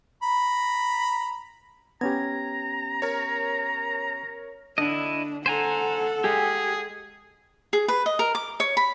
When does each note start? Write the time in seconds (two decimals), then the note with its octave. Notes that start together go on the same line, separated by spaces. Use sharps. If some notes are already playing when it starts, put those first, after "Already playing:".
0.23 A#5 B5
2.01 B3 C#4 G4 A#5 G#6
3.02 A#4 C#5
4.78 D3 D4 E4 D#5
5.46 A4 C5 F#5 G#5 A#5
6.24 G#3 G4 G#4
7.73 G#4
7.88 B4
8.06 D#5
8.19 A#4
8.35 D6
8.60 C#5
8.77 B5